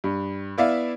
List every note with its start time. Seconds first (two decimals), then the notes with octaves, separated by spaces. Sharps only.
0.04 G2
0.58 B3 E4 D5 E5 F5